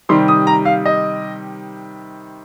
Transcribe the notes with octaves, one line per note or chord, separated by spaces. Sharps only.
C3 D#3 G3 C6
D#6
A#5
F5
D#5